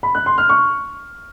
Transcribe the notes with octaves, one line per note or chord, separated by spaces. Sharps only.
B5
F#6
C6
F6
C#6